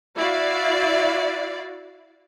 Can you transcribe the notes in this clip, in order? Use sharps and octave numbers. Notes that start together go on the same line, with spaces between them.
E4 F#4 D5 F5